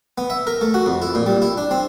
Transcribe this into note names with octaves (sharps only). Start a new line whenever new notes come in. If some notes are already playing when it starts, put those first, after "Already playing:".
B3
E5
A#4
A3
F#4
F2
E4
A#2
G3
E4
D4
C4